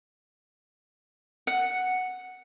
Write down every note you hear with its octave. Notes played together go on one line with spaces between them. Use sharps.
F#5